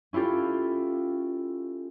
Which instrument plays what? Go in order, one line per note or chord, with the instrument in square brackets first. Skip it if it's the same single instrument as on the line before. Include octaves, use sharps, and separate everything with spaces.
[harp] C#4 E4 F4 G4 A4